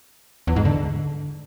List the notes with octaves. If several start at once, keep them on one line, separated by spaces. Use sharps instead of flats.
E2
G#2
D3